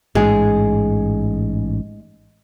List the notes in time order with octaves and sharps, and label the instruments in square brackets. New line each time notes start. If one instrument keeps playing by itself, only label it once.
[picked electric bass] A1 G#2 [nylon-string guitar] G#3 G#4